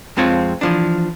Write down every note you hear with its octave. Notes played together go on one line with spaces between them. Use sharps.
F2 G#3 C4 F4 C#5
E3 F3 D4